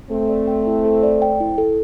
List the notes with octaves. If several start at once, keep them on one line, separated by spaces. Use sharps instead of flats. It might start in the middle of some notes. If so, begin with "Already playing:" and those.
A3 C4 A4
D5
G5
E4
A4
D5
G5
E4
A4